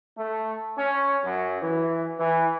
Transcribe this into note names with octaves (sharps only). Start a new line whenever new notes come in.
A3
C#4
F#2
E3
E3